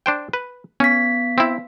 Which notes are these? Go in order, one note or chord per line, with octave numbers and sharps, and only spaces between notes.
D4 C5 G5
B4
B3 C#4 B6
C4 E4